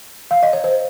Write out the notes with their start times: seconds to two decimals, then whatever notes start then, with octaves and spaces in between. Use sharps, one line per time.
0.31 F5
0.43 D#5
0.53 C#5
0.64 C5